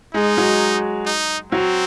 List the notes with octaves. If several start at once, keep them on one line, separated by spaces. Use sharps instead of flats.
G#3 D#4
F#3
D#4
F#3 C4